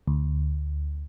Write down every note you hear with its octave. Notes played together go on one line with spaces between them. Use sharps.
D2